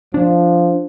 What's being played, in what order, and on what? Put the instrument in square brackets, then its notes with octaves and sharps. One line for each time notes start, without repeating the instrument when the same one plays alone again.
[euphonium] F3 [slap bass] D4